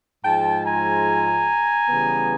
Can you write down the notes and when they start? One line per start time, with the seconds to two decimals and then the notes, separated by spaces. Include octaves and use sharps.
0.24 G#2 F3 G#3 G5 A5
0.65 G#5 A#5
1.88 C#3 E3 G3 B3